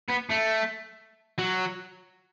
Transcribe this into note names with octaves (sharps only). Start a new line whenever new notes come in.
B3
A3
F#3